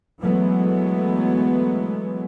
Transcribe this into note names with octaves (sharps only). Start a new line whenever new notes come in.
E3 F#3 G#3 A3 B3